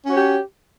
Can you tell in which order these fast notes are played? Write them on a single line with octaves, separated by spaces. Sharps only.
C#4 F#4 C#5 G4